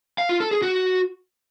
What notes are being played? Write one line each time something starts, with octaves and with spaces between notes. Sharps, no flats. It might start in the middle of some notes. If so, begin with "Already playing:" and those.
F5
F4
A4
G#4
F#4